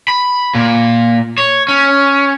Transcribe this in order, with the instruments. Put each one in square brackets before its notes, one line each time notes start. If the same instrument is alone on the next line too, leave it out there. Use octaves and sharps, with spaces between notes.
[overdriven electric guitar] B5
A#2
C#5
C#4